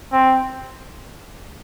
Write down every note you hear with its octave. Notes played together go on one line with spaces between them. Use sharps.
C4